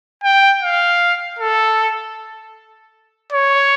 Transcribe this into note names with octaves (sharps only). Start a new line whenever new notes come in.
G5
F5
A4
C#5